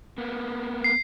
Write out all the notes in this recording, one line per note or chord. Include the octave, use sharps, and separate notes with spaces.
A#3 B3
C7